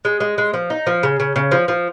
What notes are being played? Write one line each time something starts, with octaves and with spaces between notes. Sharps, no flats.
G#3
G#3
G#3
F3
D#4
F3
C#3
C#3
C#3
F3
F3